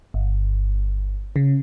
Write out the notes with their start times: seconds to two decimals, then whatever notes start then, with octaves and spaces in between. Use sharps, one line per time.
0.14 G1
1.36 C#3